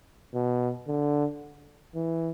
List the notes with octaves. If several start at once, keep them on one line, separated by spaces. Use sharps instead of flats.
B2
D3
E3